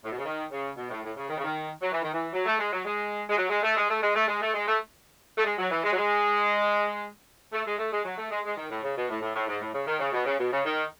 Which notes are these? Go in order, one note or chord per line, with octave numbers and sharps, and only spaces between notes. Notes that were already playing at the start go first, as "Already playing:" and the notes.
A2
B2
C#3
D#3
C#3
B2
A2
A2
C#3
D#3
C#3
D#3
F#3
E3
D#3
E3
F#3
A3
G#3
F#3
G#3
G#3
F#3
G#3
A3
G#3
A3
G#3
A3
G#3
A3
G#3
A3
A3
G#3
F#3
E3
G#3
F#3
G#3
A3
G#3
A3
G#3
F#3
A3
G#3
G#3
D#3
A2
C#3
B2
A2
A2
A2
G#2
A2
C#3
D#3
C#3
B2
C#3
B2
C#3
D#3